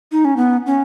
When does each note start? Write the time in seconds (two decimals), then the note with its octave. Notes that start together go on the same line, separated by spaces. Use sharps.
0.12 D#4
0.25 C#4
0.37 B3
0.66 C#4